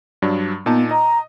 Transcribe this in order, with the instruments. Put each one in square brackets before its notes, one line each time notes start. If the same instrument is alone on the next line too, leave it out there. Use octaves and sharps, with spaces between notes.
[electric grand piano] G2 F#3 D4
[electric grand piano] A#2 D#4 A5 [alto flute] B3
[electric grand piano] D#5 [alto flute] A#5